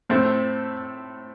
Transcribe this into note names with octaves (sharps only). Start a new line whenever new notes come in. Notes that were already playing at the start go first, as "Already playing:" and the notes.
A2 A3 C4